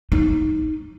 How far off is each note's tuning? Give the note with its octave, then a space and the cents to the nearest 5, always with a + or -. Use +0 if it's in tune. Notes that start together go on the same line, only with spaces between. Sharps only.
D#4 +5